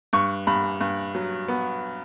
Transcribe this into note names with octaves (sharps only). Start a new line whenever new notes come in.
G2 C#6
G2 B5
G2
F#3
B3